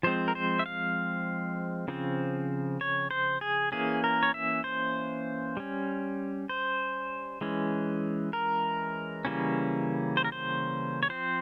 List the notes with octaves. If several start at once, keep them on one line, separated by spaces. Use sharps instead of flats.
F3 G#3 C4 C5
A#4
C5
E5
F5
C#3 F3 C4
C#5
C5
G#4
E3 A#3 C#4 G#4
A#4
C#5
E5
C5
G3 C#4
C5
E3 G#3 C#4
A#4
C#3 E3 G3 A#3 C#4
C5
A#4
C5
C#5
F3 C4 C5